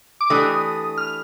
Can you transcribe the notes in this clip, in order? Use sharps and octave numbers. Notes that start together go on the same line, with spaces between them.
D6
E3 A3 D4 G4 D#6
F6